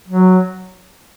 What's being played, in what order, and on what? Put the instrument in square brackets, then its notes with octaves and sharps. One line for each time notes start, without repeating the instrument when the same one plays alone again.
[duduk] F#3